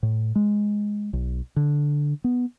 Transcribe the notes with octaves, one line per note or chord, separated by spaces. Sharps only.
A2
G#3
B1
D3
B3